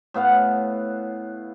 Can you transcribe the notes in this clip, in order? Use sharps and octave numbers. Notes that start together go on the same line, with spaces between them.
A2 B3 F5 F#5